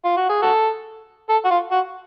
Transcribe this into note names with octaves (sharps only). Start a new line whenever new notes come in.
F4
F#4
G#4
F#4 A4
A4
F#4
F4
F#4